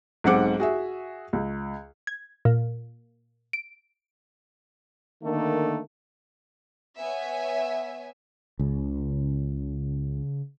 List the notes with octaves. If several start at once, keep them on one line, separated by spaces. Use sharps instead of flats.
B1 G#2 C4 F#5 D6
F#4 G#4 E5
C#2
G#6
A#2
D7
D3 D#3 A3 A#3
B3 C#5 E5 G#5
C#2 C#3